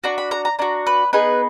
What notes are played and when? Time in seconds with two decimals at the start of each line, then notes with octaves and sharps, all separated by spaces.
0.04 D4 F#4 A#5
0.18 B5
0.31 A#5
0.45 A#5
0.59 D4 F#4 A#5
0.87 B4
1.13 B3 D#4 G#4 B4